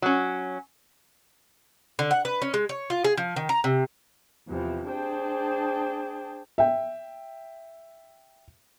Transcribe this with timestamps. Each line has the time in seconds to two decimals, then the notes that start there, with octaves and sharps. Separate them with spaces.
0.02 F#3 C#4
1.99 D3
2.11 F#5
2.25 B4
2.42 C#4
2.54 G#3
2.69 C#5
2.90 F4
3.04 G#4
3.17 F3
3.36 D#3
3.49 A#5
3.64 C3
4.48 E2 C3 E3 F3
4.91 D4 G#4 C5 G5 A5
6.58 E5 G5